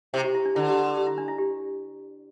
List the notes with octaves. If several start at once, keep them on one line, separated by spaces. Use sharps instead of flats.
C3 E4
G4
E4
D4
D3 E4
G4
A4
G4
E4
D4
E4
G4